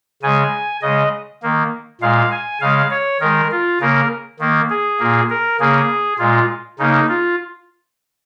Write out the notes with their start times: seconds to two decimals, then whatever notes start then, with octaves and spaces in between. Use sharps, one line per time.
0.22 C#3 G#3 G#5
0.82 C#3 G#3 D#5
1.42 D#3 A#3
2.01 A#2 G#3 F5
2.32 G#5
2.61 C#3 G#3 F5
2.91 C#5
3.20 D#3 G#3 A#4
3.51 F4
3.80 C#3 A#3 A#4
4.40 D#3 A#3
4.70 G#4
4.99 A#2 A#3
5.30 A#4
5.60 C#3 A#3 G#4
6.19 A#2 G#3 F4
6.79 C#3 A#3 D#4
7.08 F4